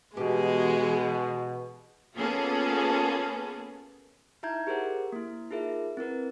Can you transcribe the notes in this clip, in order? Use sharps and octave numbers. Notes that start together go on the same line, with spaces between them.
B2 E3 G#3 G4 G#4
A#3 B3 C#4 F4 G#4 A4
D#4 E4 E5 A#5 G6 G#6
G4 G#4 A#4 C5 F#5
A#3 E4
D#4 F4 G#4 A#4 E5
C4 E4 A#4 B4